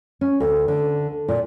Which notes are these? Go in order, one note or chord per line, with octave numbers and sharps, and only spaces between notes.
C#4
D2
D3
A#2